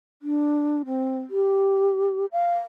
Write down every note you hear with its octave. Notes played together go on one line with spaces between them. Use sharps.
D4
C4
G4
F5